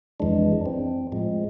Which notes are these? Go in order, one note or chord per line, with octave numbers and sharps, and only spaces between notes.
F2 E3 G#3 D4
C4
A2 F3 G#3